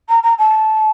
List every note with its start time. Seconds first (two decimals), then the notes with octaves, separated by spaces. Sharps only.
0.08 A#5
0.23 A#5
0.38 A5